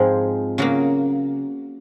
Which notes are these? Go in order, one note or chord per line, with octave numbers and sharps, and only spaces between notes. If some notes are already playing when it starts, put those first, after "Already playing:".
Already playing: G#2 F3 G#3 C4
C#3 F#3 A#3